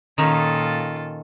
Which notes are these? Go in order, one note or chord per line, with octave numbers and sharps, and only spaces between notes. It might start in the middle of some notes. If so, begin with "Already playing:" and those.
A#2 D#3 C#4 D#4 F4 A4